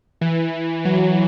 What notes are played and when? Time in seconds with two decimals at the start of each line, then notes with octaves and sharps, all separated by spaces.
0.21 E3
0.85 F#3